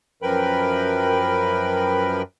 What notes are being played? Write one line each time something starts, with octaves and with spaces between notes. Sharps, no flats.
F#2 F3 A#4 B4 G5 B5